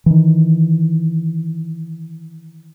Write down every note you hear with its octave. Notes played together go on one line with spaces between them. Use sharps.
D#3 E3